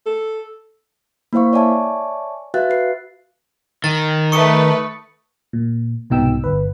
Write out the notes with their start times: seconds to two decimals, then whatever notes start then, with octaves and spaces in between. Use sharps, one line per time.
0.06 A4
1.33 A#3 E4 C5 F5 C#6
1.53 C#5 D5 E5 G#5 A5 C#6
2.54 F#4 B4 E5 F5 F#6 A6
2.70 B4 C7
3.84 D#3 A6
4.32 A3 B4 C#6 D#6 C#7
5.53 A#2
6.10 C2 G#2 B2 D#4 G5 E6
6.44 G1 B4